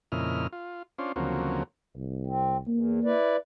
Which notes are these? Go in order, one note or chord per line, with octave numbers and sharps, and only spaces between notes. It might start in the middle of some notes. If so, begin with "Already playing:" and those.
F2 A#2 C#3 E4 D#5 F6
F4
C#4 D4 F4 C5
D2 C#3 F3 F#3 A#3 C4
C2
C4
E2 A#3
E4 B4 D5